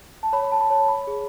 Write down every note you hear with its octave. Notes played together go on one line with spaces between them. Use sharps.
A5
C#5 B5
B5
A5
B5
C#5 A5
B5
G#4